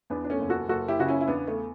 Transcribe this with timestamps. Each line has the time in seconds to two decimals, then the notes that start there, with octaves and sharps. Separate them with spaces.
0.10 E2 B3 D4
0.24 D4
0.30 A3 C#4
0.39 F#1
0.49 F#4 A4
0.69 F#1 F#4 A4
0.88 E4 G4
0.99 C#3 F#4
1.08 C#4 E4
1.21 E4
1.28 E2 B3 D4
1.47 A3